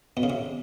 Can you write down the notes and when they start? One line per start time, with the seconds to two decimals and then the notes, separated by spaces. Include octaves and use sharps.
0.17 B2
0.23 C#3
0.30 C3